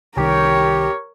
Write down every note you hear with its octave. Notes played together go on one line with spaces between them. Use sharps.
C2 D#3 G4 A#4 C#5